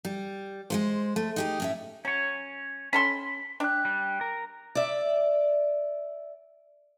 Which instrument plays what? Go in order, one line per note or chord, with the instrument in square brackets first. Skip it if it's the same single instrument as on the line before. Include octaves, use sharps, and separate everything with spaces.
[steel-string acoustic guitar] G3
G#3 A3 C5
A3
D#4 G4 G#4
A2 C#4 E5
[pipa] F#3 [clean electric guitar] C#4 C#5
[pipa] C#4 A4 C6 [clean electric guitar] B5
[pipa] D4 [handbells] G5 F#6
[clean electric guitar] G3
A#4
[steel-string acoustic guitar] D5 E5